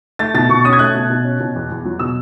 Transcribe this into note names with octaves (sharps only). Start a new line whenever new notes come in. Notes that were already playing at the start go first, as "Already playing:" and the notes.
A3 A6
B2 A6
B2 C#6
C#4 D#6
G#6
A3 F#6
B2
B2
C#4
B2
E2
E2
F#3
B2 E6